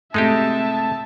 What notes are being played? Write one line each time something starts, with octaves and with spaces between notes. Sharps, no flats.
A2 C3 G#3 D#4 G4 E5 A5